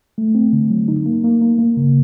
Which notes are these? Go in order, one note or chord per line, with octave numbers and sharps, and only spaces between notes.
A3
C4
D3
F#3
D#4
A#3
A#3
A#3
A#3
C#3